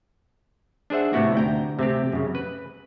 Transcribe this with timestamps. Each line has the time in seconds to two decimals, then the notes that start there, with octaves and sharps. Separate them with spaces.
0.90 D4 G#4 C5 E5 F#5
1.13 A2 C3 A3 B3 E4 F#4
1.35 D2 G5 A#5
1.79 C3 A3 C4 G4
2.12 F#2 C#3
2.35 B4